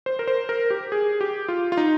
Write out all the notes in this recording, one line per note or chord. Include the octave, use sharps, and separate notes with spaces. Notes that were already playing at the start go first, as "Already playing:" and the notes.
C5
A#4
C5
A#4
G4
G#4
G4
F4
F4
D#4